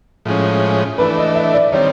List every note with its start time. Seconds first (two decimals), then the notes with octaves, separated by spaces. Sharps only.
0.25 A2 F3 G#3 C#4
0.98 E3 A3 D4 B4
1.17 D#5
1.35 E5
1.54 D5
1.72 D#3 G3 C4 C#5